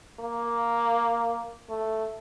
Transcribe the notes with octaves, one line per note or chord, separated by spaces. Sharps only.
A#3
A3